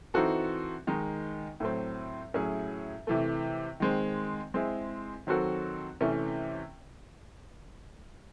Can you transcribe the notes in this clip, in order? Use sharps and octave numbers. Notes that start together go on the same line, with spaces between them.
E3 C4 D#4 F#4 A4
D#3 G#3 D#4
A2 F#3 A3 C4
A2 F#3 C#4 E4 G#4
C3 E3 A3
D#3 G#3 C4
G#3 C4 E4 G#4
D#3 F#3 C4 F#4 A4
C3 E3 A3 C#4